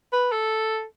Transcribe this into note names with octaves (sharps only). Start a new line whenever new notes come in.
B4
A4